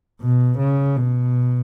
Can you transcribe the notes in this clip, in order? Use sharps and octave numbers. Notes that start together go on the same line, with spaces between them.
B2
C#3
B2